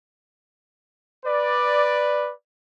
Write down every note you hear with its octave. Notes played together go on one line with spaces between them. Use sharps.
B4 D5